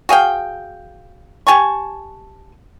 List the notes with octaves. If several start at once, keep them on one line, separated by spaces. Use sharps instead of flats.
F#4 G#4 F5 G5
G4 G#5 A5 C#6